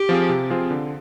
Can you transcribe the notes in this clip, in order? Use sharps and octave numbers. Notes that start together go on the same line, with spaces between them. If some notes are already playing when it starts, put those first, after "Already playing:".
Already playing: G4
F3 C4 F4 G#4
C3
F3 C4 F4 G#4
D3